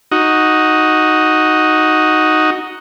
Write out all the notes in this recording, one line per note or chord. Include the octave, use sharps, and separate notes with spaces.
D#4 F#4